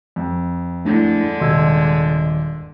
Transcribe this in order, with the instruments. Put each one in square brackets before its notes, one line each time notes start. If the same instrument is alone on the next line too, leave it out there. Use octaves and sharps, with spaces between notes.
[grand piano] F2
[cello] D3 G#3 [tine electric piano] A3 D4 E4
[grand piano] D#1 [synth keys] C3 D#5 [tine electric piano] C6 E6 G#6